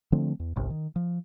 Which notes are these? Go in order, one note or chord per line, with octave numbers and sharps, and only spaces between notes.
D3 F3 A3 C4
E2
G1 C2 G2
D#3
F3